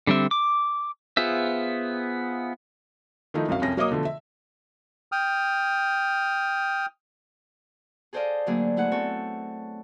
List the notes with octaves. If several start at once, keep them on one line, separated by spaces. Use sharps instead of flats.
D3 G3 C4 E5
D6
B3 F4 G#4 C5 E5
D#3 F3 A3 D#4 E4
C2 F#2 F#4 F5
C2 F2 C#4 A#6
F#3 A#3 C#5 D#5 D6 D#6
B2 D3 F3 A3
E5
G5 D#6 F6
G#4 A4 C5 D5 D#5 F5
D3 F#3 A3 A#3 D4 G#4
A3 E4 G#4 F#5
B3 C4 A4 C#5